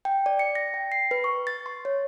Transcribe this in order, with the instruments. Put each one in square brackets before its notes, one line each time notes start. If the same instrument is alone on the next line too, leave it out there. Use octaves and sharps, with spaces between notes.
[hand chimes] G5
D5
C#7
A#6
G5
C7
B4
C#6
A6
C6
C#5